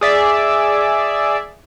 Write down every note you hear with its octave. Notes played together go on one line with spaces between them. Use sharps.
G#4 D5 E5